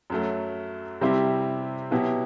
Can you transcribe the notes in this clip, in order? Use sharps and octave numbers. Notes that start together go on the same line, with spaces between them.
F#2 F#3 A3
C3 G3 C4 E4 G4
B2 F#3 B3 E4 G4